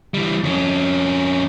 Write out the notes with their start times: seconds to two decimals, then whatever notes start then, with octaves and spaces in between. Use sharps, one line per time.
0.14 E3 G3
0.44 F2 C#4